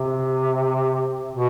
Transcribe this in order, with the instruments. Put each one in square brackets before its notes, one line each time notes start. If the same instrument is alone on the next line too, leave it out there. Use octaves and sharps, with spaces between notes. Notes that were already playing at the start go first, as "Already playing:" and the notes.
Already playing: [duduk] C3
B2